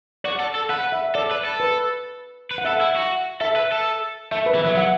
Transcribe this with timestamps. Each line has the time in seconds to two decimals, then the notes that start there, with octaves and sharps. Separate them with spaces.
0.24 F#4 D5
0.40 A4
0.55 A4
0.69 B4 F#5
0.92 E5
1.15 A4 D5
1.31 B4
1.45 A4
1.60 B4
2.51 B4
2.58 F#5
2.65 A4 E5
2.73 F#5
2.80 E4
2.96 F#4
3.41 A4 E5
3.56 B4
3.72 A4
4.32 A3 E5
4.46 B4
4.55 E3
4.61 F#3 E5
4.76 F#3 F#5